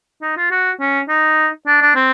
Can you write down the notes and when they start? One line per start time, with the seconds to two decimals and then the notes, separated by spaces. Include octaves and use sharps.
0.22 D#4
0.37 F4
0.51 F#4
0.80 C#4
1.08 D#4
1.67 D4
1.81 D4
1.95 C4